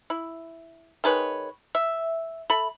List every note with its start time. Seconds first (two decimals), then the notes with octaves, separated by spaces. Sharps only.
0.10 E4
1.04 D#3 G#3 B4 C#5
1.75 E5
2.50 A4 E5 B5